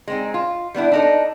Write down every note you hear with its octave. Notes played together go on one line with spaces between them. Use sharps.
G#3 C4 D#4
F4
G3 B3 D4 E4
D4 D#4 A4